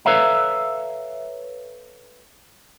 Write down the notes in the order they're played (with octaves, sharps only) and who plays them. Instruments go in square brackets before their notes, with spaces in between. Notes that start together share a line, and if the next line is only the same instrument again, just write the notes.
[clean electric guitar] A4 B4 C#5 E5 F5 A#5